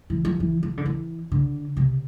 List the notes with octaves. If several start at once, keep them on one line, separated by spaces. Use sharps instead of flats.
E3
F3
E3
F3
D3
E3
D3
C3